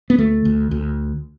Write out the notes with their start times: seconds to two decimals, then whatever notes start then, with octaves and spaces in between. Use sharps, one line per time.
0.10 B3
0.18 D2 A3
0.45 D2
0.71 D2